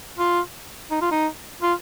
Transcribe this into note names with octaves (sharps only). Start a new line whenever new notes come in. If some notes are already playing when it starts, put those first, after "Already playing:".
F4
D#4
F4
D#4
F4